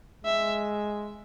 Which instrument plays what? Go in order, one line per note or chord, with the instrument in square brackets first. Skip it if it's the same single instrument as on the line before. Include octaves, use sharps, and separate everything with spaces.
[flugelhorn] G#3 [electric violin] E5